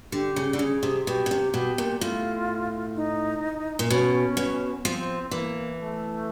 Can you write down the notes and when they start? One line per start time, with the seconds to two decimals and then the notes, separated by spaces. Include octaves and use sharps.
0.12 D3 G4
0.36 C#3
0.53 D3
0.59 C#3 G#4
0.83 C3
1.07 B2 G4
1.26 B2
1.31 C3
1.53 B2 G4
1.78 A#2
2.01 A2 F4
2.96 D#4
3.79 A#2
3.89 B2 C#4
4.37 B2
4.84 F3 C4
5.31 E3 A#3
5.79 A3